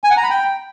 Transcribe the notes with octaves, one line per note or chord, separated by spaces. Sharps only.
G#5
F#5
A#5
B5
G5